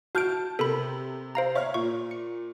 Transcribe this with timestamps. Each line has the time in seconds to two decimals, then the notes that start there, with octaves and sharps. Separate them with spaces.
0.15 F#4 A5 F6 G6 D7
0.59 C3 A4 A#4 B5
1.35 C5 F5 A#5
1.55 C#5 E5 F5 F6
1.74 A#2 C#6
2.11 C#7